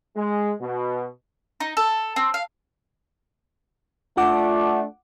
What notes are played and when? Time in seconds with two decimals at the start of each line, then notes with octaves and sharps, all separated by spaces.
0.17 G#3
0.61 B2
1.60 D#4
1.77 A4
2.16 C4
2.34 F5
4.17 A3 D4 F4 F#5 D6